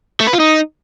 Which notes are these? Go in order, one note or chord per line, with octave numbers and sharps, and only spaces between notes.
A3
B4
F4
D#4